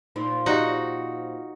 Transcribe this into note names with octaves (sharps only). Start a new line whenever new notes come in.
A#2 F3 C4 D#4
D#4 F#4 G4 D5 D#5